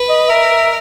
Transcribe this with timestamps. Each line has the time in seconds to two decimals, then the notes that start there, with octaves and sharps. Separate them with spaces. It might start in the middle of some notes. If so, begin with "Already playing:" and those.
Already playing: B4
0.09 D#5
0.28 A#4 E5